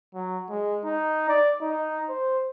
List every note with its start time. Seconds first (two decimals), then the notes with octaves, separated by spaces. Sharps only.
0.14 F#3
0.50 G#3
0.85 D#4
1.29 D5
1.61 D#4
2.09 C5